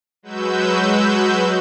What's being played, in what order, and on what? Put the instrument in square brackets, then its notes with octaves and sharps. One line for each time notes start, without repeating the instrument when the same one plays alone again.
[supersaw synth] F#3 G#3 F#4 B4 E6 G6